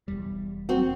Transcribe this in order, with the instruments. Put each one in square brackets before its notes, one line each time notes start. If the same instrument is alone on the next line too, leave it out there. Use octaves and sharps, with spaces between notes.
[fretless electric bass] E1 E2 G3
[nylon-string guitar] C4 F#4